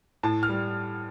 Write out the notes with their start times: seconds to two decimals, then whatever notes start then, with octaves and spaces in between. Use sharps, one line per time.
0.23 A2 A5
0.43 F6
0.49 G3